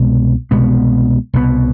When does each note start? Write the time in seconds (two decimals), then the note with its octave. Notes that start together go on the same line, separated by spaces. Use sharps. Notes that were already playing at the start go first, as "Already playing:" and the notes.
Already playing: C2 B2 G#3 B3
0.51 C2 B2 G#3 B3
1.34 C2 B2 G#3 B3